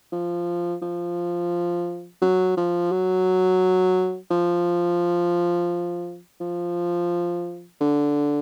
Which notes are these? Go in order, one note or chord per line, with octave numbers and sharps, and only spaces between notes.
F3
F3
F#3
F3
F#3
F3
F3
D3